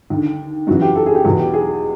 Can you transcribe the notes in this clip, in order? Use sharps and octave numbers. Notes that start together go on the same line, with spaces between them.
D#2 D3
F#2 C#3 E3 F#4
G4
A4
G#4
G4
E2 B2 F#4
G4
G#4